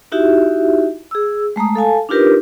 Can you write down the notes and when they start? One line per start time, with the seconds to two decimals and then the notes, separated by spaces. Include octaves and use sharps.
0.12 D#4 E4 F#4 G4 E5
1.11 G#4 E6
1.56 G#3 A3 A#5 D#6
1.75 A4 F5 G#5 A5
2.09 D4 D#4 F4 G4 A#4 B4